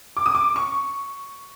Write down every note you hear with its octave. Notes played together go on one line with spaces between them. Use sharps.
D6
D#6
D6
C#6